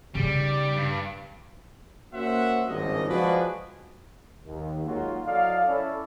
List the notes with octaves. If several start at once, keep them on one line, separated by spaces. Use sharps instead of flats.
C#3 G3 D#4
G2
A#3 C#4 F#4 C5 E5 F#5
G#1 C#2 G2 D#5
F3 G#3 F#4 G#4 B4 D5
D#2
F#3 G#3 A#3 D#4 F4 F#4
F#3 E4 A4 D5 D#5 F5
C#4 E4 A4 D5